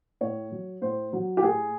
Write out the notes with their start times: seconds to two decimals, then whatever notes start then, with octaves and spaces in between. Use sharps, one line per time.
0.21 A2 C#5
0.52 F#3
0.82 A2 C5
1.13 F#3
1.37 G4
1.42 A2 G#4